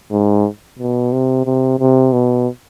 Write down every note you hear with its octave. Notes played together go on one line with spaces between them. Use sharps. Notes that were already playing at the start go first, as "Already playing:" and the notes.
G#2
B2
C3
C3
C3
B2